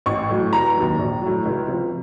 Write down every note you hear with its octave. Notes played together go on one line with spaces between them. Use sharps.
A1 C#6
A2 F#3
F1 A#5
D#2 D#3 F#3
A#1
A2 F#3
C#2
C3 F3